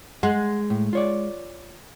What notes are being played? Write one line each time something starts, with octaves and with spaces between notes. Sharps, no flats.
G#3 F#5
A2
F4 C#5 D5